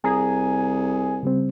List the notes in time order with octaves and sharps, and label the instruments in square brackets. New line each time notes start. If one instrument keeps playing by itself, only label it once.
[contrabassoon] C2 [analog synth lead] G#4 [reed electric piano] G#5 A#5
[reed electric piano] C#3 G3 C4